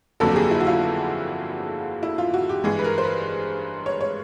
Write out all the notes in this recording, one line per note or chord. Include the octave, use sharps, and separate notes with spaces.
G1 F2 D3 F#3 A#3 A4
G4
G#4
E4
F#4
F4
E4
F4
F#4
G4
G2 E3 G#3 G#4
B4
A#4
C5
B4
C#5
C#5